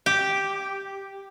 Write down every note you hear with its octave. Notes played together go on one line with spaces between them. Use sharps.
G4